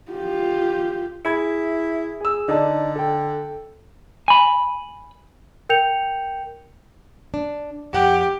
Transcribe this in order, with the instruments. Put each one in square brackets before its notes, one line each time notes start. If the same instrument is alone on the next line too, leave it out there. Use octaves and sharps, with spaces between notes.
[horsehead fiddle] F4 G4
[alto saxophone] E4 [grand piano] G#4 B5 G#6
[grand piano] G#4 E6
[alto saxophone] D3 [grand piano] D#4 D5 A5
[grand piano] A4 G5
[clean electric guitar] G#5 B5
[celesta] A#4 G5 G6 C#7 F7
[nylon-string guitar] D4
[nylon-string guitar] F2 F#5 [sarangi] G4